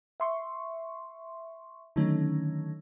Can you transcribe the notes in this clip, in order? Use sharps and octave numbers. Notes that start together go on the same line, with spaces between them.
E5 C6 C#6
D3 D#3 F#3 A3 C#4 D#4